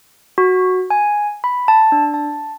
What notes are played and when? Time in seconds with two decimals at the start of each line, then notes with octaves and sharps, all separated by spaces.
0.38 F#4
0.90 G#5
1.44 B5
1.68 A5
1.92 D4
2.14 A5